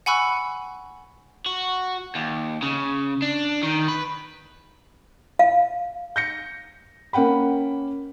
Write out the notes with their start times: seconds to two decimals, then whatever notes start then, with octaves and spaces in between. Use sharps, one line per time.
0.06 F#5 G#5 B5 C#6 E6 F#6
1.46 F#4
2.15 D#2
2.63 C#3
3.22 D4
3.63 D#3
3.88 B4
5.39 F5
6.16 G6 A#6 C#7
7.13 A#3 C#4 F#5 G5 B5